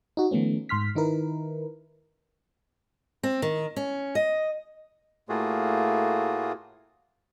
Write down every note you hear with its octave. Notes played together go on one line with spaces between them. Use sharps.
D#4 F#4
D#3 F3 A3 B3 C#4
G#2 C6 F6 B6
D#3 D#4 E4 A#4 B4
C4
D#3
C#4
D#5
A2 A3 A#3 F4 F#4 G#4